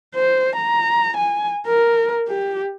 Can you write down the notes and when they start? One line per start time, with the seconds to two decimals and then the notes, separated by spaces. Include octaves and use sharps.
0.15 C5
0.56 A#5
1.17 G#5
1.66 A#4
2.29 G4